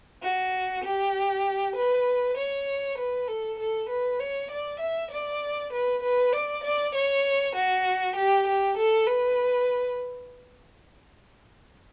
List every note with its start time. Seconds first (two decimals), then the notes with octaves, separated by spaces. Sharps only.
0.23 F#4
0.84 G4
1.76 B4
2.37 C#5
2.98 B4
3.28 A4
3.59 A4
3.90 B4
4.20 C#5
4.51 D5
4.80 E5
5.12 D5
5.73 B4
6.03 B4
6.33 D5
6.64 D5
6.95 C#5
7.55 F#4
8.16 G4
8.47 G4
8.77 A4
9.08 B4